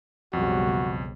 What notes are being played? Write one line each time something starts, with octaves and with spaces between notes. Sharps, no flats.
B1 F2 C#3 G3 F#4